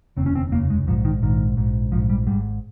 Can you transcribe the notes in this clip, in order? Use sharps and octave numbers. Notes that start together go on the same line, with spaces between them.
F1 D#2 C#3 C4
C#4
C4
F1 D#2 C#3 A#3
G#3
A#1 G#2 F3
D#3
A#1 G#2 D#3
A#1 G#2
A#1 G#2 F3
G3
G#1 G#2 G3